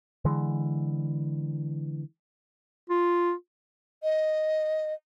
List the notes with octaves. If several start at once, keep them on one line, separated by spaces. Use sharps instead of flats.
D3 E3 G#3
F4
D#5